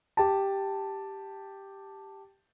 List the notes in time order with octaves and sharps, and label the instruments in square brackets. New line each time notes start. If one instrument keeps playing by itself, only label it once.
[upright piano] G4 A5